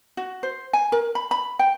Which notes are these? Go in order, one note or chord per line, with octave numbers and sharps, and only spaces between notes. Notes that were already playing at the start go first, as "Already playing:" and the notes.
F#4
C5
G#5
A#4
B5
B5
G5